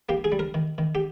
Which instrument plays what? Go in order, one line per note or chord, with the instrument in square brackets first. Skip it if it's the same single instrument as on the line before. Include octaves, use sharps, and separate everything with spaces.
[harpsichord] A#3 G4
G#4
G3
A#4
D#3
D#3
G4